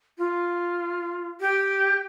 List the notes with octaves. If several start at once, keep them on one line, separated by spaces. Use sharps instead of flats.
F4
G4